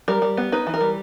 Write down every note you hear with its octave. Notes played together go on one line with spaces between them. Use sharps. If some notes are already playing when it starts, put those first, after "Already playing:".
G3 A#4
G3
B3
D#4 B4
E3
A#4
G3